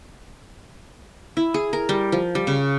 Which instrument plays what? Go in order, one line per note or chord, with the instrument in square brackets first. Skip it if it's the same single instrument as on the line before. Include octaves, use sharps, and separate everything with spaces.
[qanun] E4
G#4
A#4
G3
F3
G3
C#3